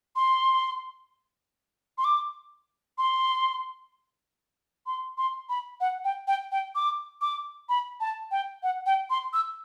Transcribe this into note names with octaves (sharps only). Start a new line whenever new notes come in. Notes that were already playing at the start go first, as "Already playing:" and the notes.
C6
C6
D6
C6
C6
C6
B5
F#5
G5
G5
G5
D6
D6
B5
A5
G5
F#5
G5
C6
E6